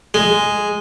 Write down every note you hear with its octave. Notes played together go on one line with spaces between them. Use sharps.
G#3